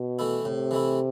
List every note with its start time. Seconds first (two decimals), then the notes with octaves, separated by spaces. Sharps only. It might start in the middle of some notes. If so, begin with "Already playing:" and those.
Already playing: B2
0.19 E3 A3 E4
0.45 A2 C3
0.71 E3 A3 E4